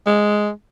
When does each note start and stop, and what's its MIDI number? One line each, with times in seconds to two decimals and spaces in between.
0.07 0.51 56